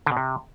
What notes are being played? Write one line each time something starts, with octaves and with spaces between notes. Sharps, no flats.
D3
B2
C3